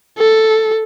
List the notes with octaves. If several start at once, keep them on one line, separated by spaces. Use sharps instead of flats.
A4